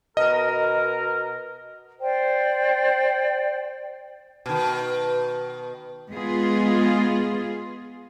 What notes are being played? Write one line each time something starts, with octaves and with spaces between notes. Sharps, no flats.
B2 A#4 D#5
C5 D5 G5
B2 D#3
G#3 B3 F4 G#4